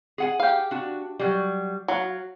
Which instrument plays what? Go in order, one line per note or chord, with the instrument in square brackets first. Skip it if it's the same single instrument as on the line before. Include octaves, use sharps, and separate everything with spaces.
[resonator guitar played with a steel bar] G#4 F#5 G#5
[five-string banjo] G4 F5
[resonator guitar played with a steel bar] D4 F#4
F#3 G3
[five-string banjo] F#3 [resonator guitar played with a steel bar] F5